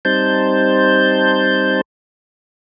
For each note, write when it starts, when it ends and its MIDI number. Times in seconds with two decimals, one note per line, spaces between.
0.05 1.81 55
0.05 1.81 60
0.05 1.81 63
0.05 1.81 72
0.05 1.81 81
0.05 1.81 91